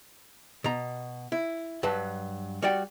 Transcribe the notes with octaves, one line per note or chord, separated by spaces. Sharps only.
B2 A#5
E4
G2 F#3 B4 A5
G3 F#4 D5 F#5 G5